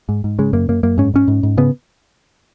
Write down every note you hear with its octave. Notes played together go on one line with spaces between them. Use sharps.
G#2
G#2
C#3 G#3
F#2 A#3
F#2 A#3
F#2 A#3
G#2 C#4
G#2 C#4
G#2
G#2
C#3 B3